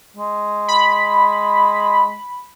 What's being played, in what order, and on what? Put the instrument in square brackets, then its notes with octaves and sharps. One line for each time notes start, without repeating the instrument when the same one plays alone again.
[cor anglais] G#3
[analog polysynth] B5